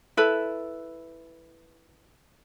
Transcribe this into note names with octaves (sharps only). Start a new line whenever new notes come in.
E4 A4 B4